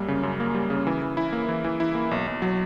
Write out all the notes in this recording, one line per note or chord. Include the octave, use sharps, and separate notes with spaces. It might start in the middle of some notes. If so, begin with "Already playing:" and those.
Already playing: F#2 G3 A#3
C#3
F#2
A#3
G3
C#3
E3
E3
E4
A#3
E3
E3
E4
A#3
B1
B1
F#3